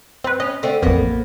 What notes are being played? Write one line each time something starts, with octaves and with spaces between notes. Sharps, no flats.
G2 C4 B4
C#4 D#5
D3 A3 C4
A1 F2 A#3 B3